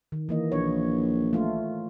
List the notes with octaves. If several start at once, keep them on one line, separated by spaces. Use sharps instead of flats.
D#3
E3 A#3 D#5
A#1 C#5
A3 F4